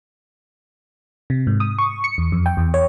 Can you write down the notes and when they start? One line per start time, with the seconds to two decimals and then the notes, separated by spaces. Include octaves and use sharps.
1.30 C3
1.47 G#2
1.60 D#6
1.78 C#6
2.04 C#7
2.18 E2
2.32 F2
2.46 G5
2.57 E2
2.74 C#5